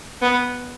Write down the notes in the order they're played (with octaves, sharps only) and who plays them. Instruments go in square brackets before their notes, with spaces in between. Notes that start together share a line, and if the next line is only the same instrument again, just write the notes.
[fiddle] B3